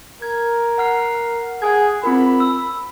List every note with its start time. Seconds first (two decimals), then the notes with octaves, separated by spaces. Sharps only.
0.22 A#4 G#6
0.78 F#5 F6 C7
1.62 G#4 F#5 G#5 G#6
2.03 C4 F4 A#4 B5
2.40 E6